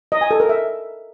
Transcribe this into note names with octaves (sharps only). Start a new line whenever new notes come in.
D#5
G#5
A4
A#4
E5